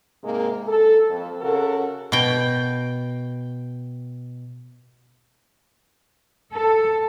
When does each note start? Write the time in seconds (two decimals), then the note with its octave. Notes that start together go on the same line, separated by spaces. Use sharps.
0.24 G#2 C3 G#3 A#3
0.68 A4
1.09 F2
1.40 C#3 F#4 A4 A#4
2.12 B2 G5
6.52 A4